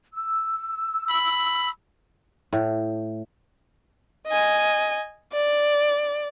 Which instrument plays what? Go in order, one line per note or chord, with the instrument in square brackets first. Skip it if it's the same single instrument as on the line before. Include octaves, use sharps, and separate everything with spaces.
[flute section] E6
[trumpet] B5
[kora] A2
[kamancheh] D#5 G#5
D5